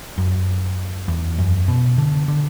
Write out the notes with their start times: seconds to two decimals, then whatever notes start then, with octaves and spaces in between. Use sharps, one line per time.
0.18 F#2
1.08 E2
1.38 F#2
1.68 B2
1.98 D3
2.28 D3